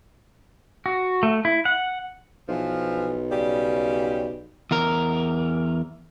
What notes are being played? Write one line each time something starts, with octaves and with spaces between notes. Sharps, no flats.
F#4
A3
E4
F#5
B1 E3 F3
C#3 G3 G4
E2 A#4